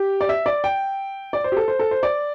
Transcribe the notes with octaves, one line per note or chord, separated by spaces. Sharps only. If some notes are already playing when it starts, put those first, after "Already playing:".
Already playing: G4
D5
E5
D5
G5
D5
C5
G4
A4
C5
A4
C5
D5